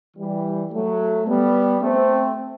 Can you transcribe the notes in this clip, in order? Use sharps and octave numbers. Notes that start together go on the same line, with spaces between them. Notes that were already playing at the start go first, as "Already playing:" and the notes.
E3 G3
F#3 A3
G3 B3
A3 C4